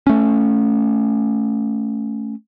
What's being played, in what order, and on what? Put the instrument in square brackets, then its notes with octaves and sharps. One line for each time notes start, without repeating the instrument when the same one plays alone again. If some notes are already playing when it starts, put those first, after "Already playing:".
[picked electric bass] A3 C#4